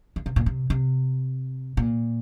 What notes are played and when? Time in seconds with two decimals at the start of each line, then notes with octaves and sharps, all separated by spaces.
0.16 D3
0.26 C3
0.36 A#2
0.46 C3
0.70 C3
1.77 A#2